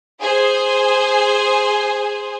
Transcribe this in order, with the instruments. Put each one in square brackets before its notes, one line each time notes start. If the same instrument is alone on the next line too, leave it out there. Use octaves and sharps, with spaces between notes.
[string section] G#4 C5